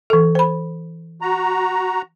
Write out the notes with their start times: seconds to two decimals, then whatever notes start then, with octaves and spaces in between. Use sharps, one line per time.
0.10 E3 A4
0.35 C5 B5
1.22 F#4 A#5